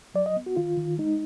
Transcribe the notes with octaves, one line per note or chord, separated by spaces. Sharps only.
F#3 D5
D#5
B3
F#4
D#3 F4
D#3
G#3 D#4